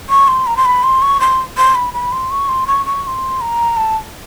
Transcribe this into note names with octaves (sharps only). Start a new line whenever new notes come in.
C#6
C6
A#5
C6
B5
C6
C#6
C6
C6
B5
B5
C6
C#6
C6
C#6
C#6
C#6
C6
A#5
A5